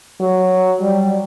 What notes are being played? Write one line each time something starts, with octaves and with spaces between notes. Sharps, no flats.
F#3
G3